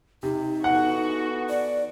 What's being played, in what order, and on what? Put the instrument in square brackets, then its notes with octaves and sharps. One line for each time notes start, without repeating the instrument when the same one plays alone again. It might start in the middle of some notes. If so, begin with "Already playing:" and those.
[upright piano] C3 [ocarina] D#4
[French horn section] E3 B3 A4 [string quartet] F#4 C#6 [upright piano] F#5
[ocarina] D5